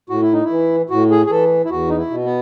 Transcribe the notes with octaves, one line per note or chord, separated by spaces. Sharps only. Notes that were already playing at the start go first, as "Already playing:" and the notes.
A2 F#4
E4
D#4
E4
E3
A2 F#4
G#4
G#4
E3 A4
E4
E2 F#4
D#4
E4
B2
B3